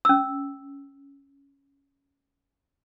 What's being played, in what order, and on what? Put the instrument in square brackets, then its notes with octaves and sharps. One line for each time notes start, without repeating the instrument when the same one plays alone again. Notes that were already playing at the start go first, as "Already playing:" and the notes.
[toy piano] C#4 E6